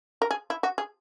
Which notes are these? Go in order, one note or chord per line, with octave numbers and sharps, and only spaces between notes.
A#4
G#4
E4
F#4
G#4